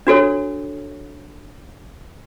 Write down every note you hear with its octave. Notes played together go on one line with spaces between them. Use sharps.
D4 F#4 A4 C#5